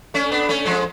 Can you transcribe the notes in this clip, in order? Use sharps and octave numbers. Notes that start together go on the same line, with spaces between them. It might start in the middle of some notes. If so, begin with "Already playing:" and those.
A3 C#4
B3 D4
A3 C#4
F3 G#3